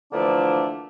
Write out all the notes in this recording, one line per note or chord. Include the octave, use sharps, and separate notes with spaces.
D3 E3 F3 A3 A#3 D4